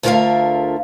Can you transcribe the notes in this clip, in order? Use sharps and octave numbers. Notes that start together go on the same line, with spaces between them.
D2 D3 F4 A#4 E5 F5